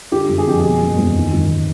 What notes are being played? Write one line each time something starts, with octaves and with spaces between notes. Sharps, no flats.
D3 G4
G1
G#4
F2 G4
B2 G#4
F#1
E2
D#3
G#1